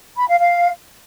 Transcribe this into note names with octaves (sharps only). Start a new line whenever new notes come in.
B5
F5
F5